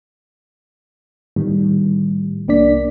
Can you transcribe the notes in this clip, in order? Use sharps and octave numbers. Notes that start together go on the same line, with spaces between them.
A2 D#3 G3
C2 A#3 D4 D5 B6